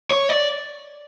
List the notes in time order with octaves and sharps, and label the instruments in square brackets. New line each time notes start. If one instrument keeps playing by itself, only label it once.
[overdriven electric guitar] C#5
D5